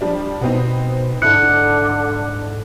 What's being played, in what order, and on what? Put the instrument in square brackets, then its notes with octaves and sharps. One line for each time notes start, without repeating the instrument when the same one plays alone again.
[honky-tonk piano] F3 G3 D4
[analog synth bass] B2 [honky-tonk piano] B3 C4 D#4
[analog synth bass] G#2 [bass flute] D3 [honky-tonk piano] D#4 E4 A4 [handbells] F#6 C#7